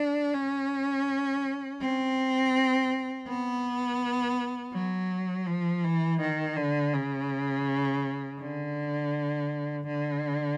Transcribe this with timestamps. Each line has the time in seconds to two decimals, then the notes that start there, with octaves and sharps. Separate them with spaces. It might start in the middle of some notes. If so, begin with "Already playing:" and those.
Already playing: D4
0.34 C#4
1.81 C4
3.27 B3
4.73 F#3
5.47 F3
5.84 E3
6.21 D#3
6.56 D3
6.93 C#3
8.40 D3
9.87 D3